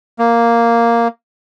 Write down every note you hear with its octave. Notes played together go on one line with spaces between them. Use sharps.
A#3